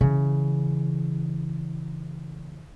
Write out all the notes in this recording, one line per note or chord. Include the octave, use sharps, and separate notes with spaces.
C#3 E3